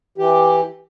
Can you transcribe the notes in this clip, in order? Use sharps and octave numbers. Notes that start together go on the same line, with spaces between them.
E3 G4